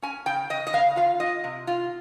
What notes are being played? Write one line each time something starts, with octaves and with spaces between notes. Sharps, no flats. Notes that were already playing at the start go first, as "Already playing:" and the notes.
C#4 G#5
C#3 G5
C#3 D#5
D#5
C#3 F5
F4 F5
F4 D#5
C3
F4